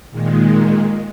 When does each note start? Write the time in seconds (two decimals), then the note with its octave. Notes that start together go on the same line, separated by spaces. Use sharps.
0.11 A#2 D#3 G#3